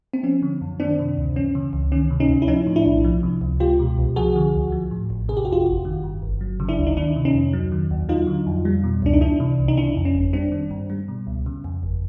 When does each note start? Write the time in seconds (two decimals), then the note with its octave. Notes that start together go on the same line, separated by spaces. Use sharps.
0.14 C4
0.23 F3 C#4
0.42 D3
0.61 F#2
0.80 D#3 C4 D4
0.99 C3
1.17 D2
1.36 E3 C#4
1.55 C#3
1.73 C#2
1.92 D#3 C#4
2.10 C3
2.20 C#4 D#4
2.30 D2
2.42 E4
2.48 F3 C#4 D#4
2.67 A2
2.76 D4 E4
2.86 B1
3.04 F3
3.23 C3
3.41 C#2
3.60 G#3 F4 G4
3.79 B2
3.98 C2
4.16 F3 F#4 G#4
4.36 D3
4.54 D2
4.72 F3
4.91 A2
5.10 A1
5.29 C3 G#4
5.37 G4
5.45 F2 F#4
5.52 F4 G4
5.66 G1
5.85 D#3
6.04 G2
6.23 G1
6.41 F#3
6.60 C#3
6.69 D4 E4
6.78 D2
6.87 D#4
6.97 D#3 D4 E4
7.16 C3
7.25 C#4 D#4
7.35 F2
7.53 F#3
7.72 D#3
7.91 D#2
8.09 F#3 D#4 F4
8.27 D3
8.47 F2
8.65 G3
8.84 B2
9.02 C#2 D4
9.13 D#4
9.21 E3 D4 E4
9.40 C3
9.59 C2
9.68 D#4
9.77 C#3 D4 E4
9.96 F2
10.05 C#4
10.15 G1
10.33 G3 C4 D4
10.52 D#3
10.71 G2
10.90 G3
11.08 B2
11.27 C#2
11.46 C#3
11.64 F2
11.83 G1